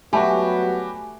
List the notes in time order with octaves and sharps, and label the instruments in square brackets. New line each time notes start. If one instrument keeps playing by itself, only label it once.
[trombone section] F#3 G3 B3 [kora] A3 [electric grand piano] F#4 G4 [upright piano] G#5 B5